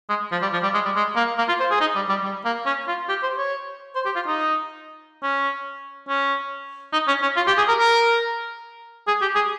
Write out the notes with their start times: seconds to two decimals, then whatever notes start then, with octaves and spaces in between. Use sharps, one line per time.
0.09 G#3
0.32 F3
0.42 G3
0.53 F3
0.63 G3
0.74 G#3
0.85 G3
0.96 G#3
1.16 A#3
1.38 A#3
1.48 F4
1.60 C5
1.71 G#4
1.81 D#4
1.96 G3
2.09 G3
2.24 G3
2.45 A#3
2.66 C#4
2.88 F4
3.09 G4
3.23 C5
3.38 C#5
3.95 C5
4.05 G4
4.15 F4
4.27 D#4
5.23 C#4
6.08 C#4
6.93 D#4
7.08 C#4
7.22 C#4
7.36 F4
7.47 G4
7.57 G#4
7.68 A#4
7.79 A#4
9.07 G#4
9.22 G4
9.35 G#4